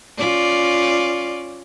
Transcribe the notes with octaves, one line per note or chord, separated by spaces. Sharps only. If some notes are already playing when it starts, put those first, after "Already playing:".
C#4 F4 D5